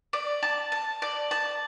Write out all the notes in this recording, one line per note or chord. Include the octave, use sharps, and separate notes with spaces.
D5
A5
A5
D5
A5